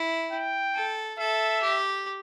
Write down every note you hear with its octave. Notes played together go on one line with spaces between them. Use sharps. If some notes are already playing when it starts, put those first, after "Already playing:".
Already playing: E4
G5
A4
A4 E5
G4